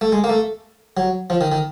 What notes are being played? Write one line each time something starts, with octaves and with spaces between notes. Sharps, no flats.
A3
G#3
A#3
A3
F#3
F3
D#3
D#3